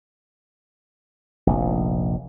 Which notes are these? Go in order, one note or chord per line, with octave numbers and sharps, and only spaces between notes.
F1 A#1